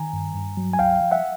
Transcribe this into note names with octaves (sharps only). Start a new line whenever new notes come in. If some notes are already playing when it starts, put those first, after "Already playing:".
Already playing: D#3 G#5 A#5
G2
G2
F#3
G#5
C#2 F5 G5
F3
E5 F#5